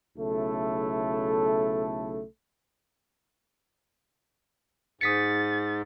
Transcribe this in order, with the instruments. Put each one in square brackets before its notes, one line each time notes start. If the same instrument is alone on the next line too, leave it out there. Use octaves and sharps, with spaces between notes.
[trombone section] B1 C#3 A3 E4 A4
[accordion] G#2 [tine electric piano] D#6 B6 C#7 [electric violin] A6